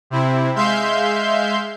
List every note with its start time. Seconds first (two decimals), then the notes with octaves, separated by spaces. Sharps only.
0.10 C3 C4 E4
0.56 G#3 E5 F5 C6 G6